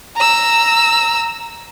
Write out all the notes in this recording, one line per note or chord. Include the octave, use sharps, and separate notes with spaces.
A#5 E6